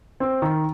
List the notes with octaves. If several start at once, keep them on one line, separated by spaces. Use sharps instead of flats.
C4
D#3